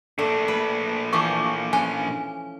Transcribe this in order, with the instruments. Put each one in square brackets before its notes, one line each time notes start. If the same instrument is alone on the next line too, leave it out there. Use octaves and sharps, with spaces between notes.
[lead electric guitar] A#2 D4 [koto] A3
[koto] B4
[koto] E3 F3 A4 [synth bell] C#6 D6
[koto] C#4 [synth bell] G#5